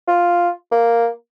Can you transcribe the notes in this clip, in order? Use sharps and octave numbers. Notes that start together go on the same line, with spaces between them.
F4
A#3